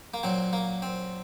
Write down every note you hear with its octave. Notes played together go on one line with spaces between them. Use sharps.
A#3
A#2 F#3 C4
A#3
C4